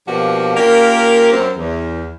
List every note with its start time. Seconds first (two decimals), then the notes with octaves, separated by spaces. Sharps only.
0.07 B2 F3 A#3 D4 F#4 G4
0.55 A#3 C#4 F4 G4 A#4
1.32 F#2 C4
1.56 E2